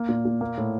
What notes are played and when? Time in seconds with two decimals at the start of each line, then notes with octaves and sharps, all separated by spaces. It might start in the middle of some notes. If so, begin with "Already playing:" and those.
Already playing: A#3
0.09 A#2
0.25 A#2
0.41 A#3
0.57 A2